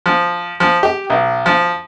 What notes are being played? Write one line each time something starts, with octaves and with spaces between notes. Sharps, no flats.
F3
F3
G4
B1
F3